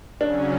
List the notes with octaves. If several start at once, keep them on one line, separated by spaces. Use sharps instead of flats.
C#3 F#3 C#4 D4